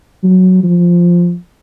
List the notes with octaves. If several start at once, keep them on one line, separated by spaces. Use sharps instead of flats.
F#3
F3